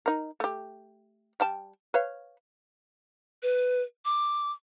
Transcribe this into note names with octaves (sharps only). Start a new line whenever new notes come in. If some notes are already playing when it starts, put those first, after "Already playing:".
D#4 A#4
A3 G4
G3 G5 A5
B4 C#5 F5
B4
D6